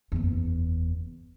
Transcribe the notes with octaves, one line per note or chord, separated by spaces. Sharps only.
F#1 E2